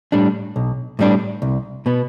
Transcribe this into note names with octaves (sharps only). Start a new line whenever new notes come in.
A2 G3 D4
B1
A2 G3 D4
C2
B2 B3